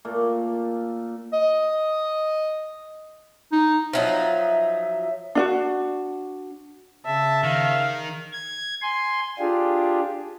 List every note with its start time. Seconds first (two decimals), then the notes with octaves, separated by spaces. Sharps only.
0.05 A#2 A3 A#3
1.33 D#5
3.52 D#4
3.93 F3 F#3 D#4 E5
5.35 D4 F4 F#4
7.06 C#3 E5 A5
7.43 D#3 F5
8.33 G#6
8.82 G#5 C6
9.39 D4 F4 G4 G#4